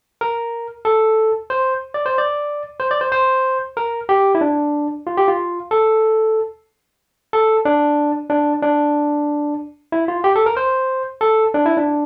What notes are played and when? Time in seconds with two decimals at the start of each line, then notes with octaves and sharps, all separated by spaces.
0.21 A#4
0.85 A4
1.50 C5
1.94 D5
2.06 C5
2.18 D5
2.80 C5
2.91 D5
3.01 C5
3.12 C5
3.77 A#4
4.09 G4
4.35 E4
4.41 D4
5.07 F4
5.17 G4
5.28 F4
5.71 A4
7.33 A4
7.65 D4
8.30 D4
8.63 D4
9.92 E4
10.08 F4
10.24 G4
10.36 A4
10.46 A#4
10.57 C5
11.21 A4
11.54 D4
11.66 E4
11.77 D4